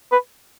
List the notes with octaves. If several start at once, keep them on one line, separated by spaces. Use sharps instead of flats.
B4